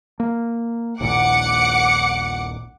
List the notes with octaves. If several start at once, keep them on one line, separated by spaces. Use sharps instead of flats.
A#3
D#1 A#1 A#2 F#5 D6 C#7